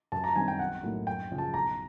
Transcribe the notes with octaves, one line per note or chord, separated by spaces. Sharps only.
F#2 A5
A#5
D#3 G3 C4 G#5
G5
B1 F#5
A2 F#3 A#3 D#4
F#2 G5
C#3 F3
A5
B1 A#5